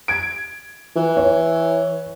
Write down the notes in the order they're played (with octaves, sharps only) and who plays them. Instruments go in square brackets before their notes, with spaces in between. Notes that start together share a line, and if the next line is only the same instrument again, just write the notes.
[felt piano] G#6 D7
[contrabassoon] E3
[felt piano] C#5